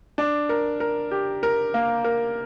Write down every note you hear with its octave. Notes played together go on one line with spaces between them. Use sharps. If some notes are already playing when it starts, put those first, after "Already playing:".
D4
A#4
A#4
G4
A#4
A#3
A#4